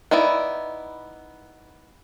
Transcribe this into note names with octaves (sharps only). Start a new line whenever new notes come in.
B3 D#4 E4 D5